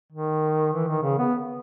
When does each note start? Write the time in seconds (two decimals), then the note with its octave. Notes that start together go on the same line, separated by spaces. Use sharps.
0.12 D#3
0.73 E3
0.88 D#3
1.02 C#3
1.18 B3